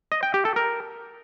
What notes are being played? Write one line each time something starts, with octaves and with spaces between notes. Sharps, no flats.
D#5
G5
G4
A4
A#4